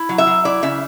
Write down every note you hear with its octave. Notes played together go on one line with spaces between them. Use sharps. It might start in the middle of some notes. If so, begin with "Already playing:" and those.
Already playing: E4
F#3
E5
F#3
E4 D5
C#3 E5